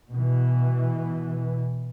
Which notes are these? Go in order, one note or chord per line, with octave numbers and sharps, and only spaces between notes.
B2 E3